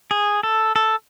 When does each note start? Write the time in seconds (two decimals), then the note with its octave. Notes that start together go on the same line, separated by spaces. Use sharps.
0.11 G#4
0.43 A4
0.76 A4